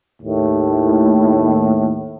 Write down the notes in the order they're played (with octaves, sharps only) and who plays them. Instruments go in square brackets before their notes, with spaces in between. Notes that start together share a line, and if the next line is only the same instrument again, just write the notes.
[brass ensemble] D#2 A2